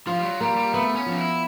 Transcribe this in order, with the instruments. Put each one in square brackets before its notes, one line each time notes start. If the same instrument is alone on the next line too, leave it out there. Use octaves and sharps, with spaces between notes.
[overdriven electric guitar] F3 [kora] F4
[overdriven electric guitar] G3
F#3
[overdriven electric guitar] G3 [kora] A#3
[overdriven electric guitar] G3
[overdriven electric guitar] A3 [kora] B3
[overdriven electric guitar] C#4
[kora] F3
[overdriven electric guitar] D#4
E4